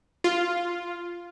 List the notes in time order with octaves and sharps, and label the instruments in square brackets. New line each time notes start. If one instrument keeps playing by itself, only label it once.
[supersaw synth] F4